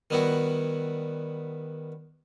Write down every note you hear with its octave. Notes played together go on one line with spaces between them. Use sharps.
D#3 G3 B3 E4 F#4